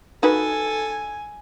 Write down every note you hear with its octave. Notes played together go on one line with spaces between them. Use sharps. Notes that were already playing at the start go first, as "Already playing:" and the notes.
D#4 F#4 A4 B4 G#5